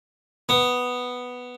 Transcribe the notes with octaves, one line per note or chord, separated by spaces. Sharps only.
B3